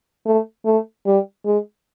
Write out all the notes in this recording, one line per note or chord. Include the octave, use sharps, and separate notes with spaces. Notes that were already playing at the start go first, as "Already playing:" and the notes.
A3
A3
G3
G#3